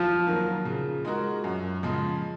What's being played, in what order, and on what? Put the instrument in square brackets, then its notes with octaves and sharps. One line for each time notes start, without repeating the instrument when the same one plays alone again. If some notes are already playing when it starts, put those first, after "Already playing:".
Already playing: [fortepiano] F3
[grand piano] D#3 F#3 A#3 F4
C#3
G#3 D#4 F#4 A#4
F#2
C#3 F3 G#3